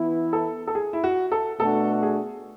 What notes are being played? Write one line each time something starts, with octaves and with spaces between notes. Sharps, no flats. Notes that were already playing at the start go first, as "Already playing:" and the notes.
Already playing: E3 B3 E4
A4
A4
G#4
E4
F#4
A4
B2 A3 D4 F#4 A4
G#4